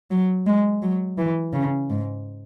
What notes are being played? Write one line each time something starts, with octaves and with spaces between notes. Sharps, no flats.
F#3
G#3
F#3
E3
C#3
G#2